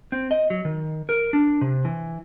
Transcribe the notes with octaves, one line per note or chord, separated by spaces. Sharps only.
C4
D#5
F#3
D#3
A#4
D4
C3
E3